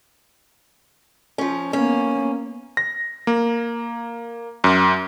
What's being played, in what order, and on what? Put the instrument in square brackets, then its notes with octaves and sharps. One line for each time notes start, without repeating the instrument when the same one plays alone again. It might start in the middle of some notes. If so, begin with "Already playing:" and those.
[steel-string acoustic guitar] F3 C#4
[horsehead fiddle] A#3 B3 [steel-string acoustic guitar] C#4
[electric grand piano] A#6
A#3
F#2